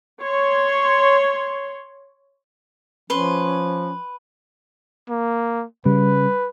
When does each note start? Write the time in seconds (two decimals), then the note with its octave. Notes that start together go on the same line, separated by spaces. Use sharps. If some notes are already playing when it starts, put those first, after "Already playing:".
0.21 C#5 C6
3.10 F3 C#4 B4 C6
5.09 A#3
5.86 C#3 G3 B4